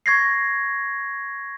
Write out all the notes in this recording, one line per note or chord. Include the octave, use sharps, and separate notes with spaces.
C#6 G#6 A#6 C7